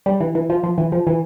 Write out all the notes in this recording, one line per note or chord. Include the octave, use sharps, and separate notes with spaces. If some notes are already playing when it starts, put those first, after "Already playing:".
G3
E3
E3
F3
F3
E3
F3
E3